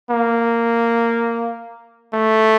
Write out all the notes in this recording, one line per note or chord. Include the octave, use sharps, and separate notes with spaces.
A#3
A3